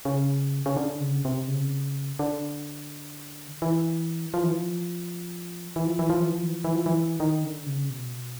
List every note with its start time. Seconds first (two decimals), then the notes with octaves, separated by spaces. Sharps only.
0.05 C#3
0.66 C#3
0.77 D3
1.00 C#3
1.25 C3
1.48 C#3
2.19 D3
3.62 E3
4.34 F3
4.43 E3
4.52 F3
5.76 E3
5.87 F3
5.99 E3
6.10 F3
6.20 E3
6.32 F3
6.43 E3
6.53 F3
6.64 E3
6.75 F3
6.86 E3
7.20 D#3
7.44 D3
7.66 C#3
7.90 B2